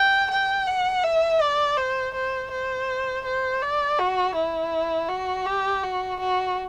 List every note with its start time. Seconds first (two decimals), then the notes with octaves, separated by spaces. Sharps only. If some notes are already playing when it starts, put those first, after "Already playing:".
Already playing: G5
0.31 G5
0.67 F#5
1.04 E5
1.41 D5
1.77 C5
2.14 C5
2.51 C5
3.25 C5
3.62 D5
3.99 F#4
4.35 E4
5.09 F#4
5.46 G4
5.83 F#4
6.20 F#4